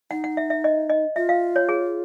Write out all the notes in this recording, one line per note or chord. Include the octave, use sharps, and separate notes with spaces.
D#4 F#5
F#5
E5
E5
D#5
D#5
F4 E5
F5
C#5
G#4